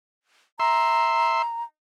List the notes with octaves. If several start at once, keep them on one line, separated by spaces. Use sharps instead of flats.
E5 A#5 C6